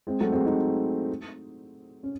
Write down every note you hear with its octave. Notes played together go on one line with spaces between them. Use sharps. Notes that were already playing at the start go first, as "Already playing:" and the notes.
G#3 C4
F#3 A3
G#3 C4
C4 D#4
C#4